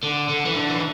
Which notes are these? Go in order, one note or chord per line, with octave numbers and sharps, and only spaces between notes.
D3
D3
E3
D3
E3